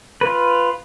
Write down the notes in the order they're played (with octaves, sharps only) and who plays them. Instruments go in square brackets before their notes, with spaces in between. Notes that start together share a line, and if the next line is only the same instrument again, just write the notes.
[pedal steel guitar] F4 B4